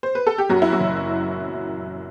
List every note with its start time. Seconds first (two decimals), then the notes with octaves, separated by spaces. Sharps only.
0.03 C5
0.15 B4
0.27 A4
0.38 G4
0.49 F#2 F#3 F#4
0.62 E4
0.72 F#3 F#4
0.80 F#1